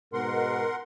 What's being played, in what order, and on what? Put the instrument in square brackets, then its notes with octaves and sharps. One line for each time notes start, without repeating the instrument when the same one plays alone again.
[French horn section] G#2 B2 [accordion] A#4 F#5 C6